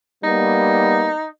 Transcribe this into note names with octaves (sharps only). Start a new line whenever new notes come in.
G3 A#3 B3 D#4